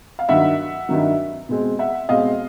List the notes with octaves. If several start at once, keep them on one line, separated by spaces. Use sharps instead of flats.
F5
G2 D#3 F#3 E5 F#5
G2 D#3 F#3
B2 G#3 C4
E5 F#5
B2 G#3 C4 D#5 F5